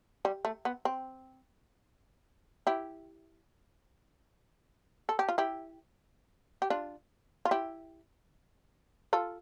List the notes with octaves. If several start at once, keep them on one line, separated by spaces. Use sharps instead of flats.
G3
A3
B3
C4
E4 G4
A4
G4
F4
E4 G4
G4
D4 F4
F4
E4 G4
F4 A4